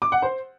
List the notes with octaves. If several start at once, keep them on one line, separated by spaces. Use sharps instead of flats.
D6
F#5
C5